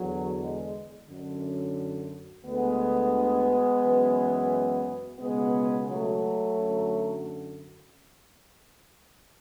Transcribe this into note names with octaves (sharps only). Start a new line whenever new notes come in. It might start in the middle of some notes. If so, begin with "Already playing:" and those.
Already playing: E2 D3 F#3
G#3
F#2 D3
D2 D3 G#3 B3
F#2 E3
C#2 B2 G#3 B3
F#3 A3
F#2 D3